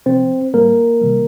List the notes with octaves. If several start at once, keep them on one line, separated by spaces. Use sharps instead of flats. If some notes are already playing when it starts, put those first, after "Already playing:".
C3 F3 C4 C5
A2 G3 A#3 A#4
C3 D#3 G3